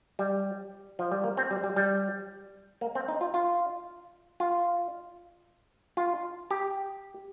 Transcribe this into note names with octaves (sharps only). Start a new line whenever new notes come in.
G3
F3
G3
A#3
C4
G3
G3
G3
A#3
C4
D#4
F4
F4
F4
F4
G4